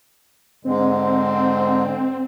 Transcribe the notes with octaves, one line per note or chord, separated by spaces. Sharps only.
G#2 D3 G#3 C4